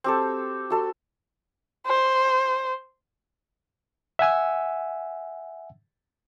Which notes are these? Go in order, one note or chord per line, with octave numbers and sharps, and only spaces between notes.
C4 G4 A4
F#4 A4 C6
C5
E5 F#5 G#5 E6